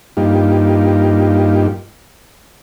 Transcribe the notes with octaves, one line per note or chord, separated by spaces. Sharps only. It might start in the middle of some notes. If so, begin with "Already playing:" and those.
G2 A#3 D#4 F4 G4